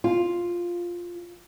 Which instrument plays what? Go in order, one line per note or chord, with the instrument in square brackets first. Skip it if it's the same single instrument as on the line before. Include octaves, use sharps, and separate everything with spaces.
[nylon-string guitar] F4